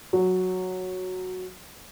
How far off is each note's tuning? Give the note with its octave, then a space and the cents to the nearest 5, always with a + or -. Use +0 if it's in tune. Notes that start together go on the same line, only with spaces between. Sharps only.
F#3 -5